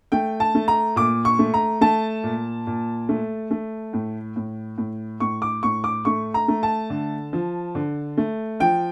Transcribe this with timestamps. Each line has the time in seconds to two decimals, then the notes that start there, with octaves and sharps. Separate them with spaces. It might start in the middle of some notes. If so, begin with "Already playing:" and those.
0.12 A3 G5
0.40 A5
0.55 A3
0.68 A#5
0.96 A#2 D6
1.25 C#6
1.39 A3
1.54 A#5
1.81 A3 A5
2.24 A#2
2.67 A#2
3.09 A3
3.51 A3
3.93 A2
4.36 A2
4.78 A2
5.20 A2 C#6
5.42 D6
5.63 A2 C#6
5.84 D6
6.05 A3 C#6
6.34 A#5
6.48 A3
6.63 A5
6.90 D3
7.33 F3
7.75 D3
8.17 A3
8.60 F3 G5